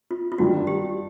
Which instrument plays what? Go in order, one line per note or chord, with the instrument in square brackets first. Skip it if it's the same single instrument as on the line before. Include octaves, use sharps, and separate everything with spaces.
[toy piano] F4
F4
[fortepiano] G#1 G2 D#3 [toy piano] F#4
[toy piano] G4